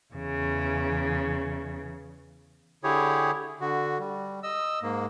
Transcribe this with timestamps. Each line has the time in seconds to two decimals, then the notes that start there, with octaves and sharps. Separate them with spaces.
0.14 E2 C#3
2.84 D3 E4 G4 G#4 C#5
3.61 D3 F#4
4.00 G3
4.43 D#5 E6
4.83 G#2 A#3